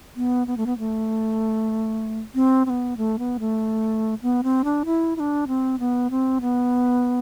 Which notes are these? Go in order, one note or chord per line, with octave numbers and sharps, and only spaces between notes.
B3
B3
A3
B3
A3
C4
C4
B3
A3
B3
A3
B3
C4
D4
E4
E4
D4
C4
B3
C4
B3